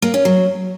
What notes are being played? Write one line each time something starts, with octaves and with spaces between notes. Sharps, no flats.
A#3
C#4
F#3